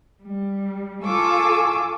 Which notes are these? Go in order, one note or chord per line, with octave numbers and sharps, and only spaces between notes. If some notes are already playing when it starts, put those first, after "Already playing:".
G3
F4 A4 G#5 C#6 D6 E6